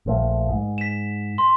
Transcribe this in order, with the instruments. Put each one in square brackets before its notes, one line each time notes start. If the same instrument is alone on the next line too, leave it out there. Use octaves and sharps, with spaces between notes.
[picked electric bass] A#1 F3 A3
G#2
[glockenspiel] B6 E7
C6